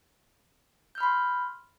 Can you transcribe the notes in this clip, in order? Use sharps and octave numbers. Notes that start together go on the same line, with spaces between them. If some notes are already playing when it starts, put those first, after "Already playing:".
B5 C6 F6 G6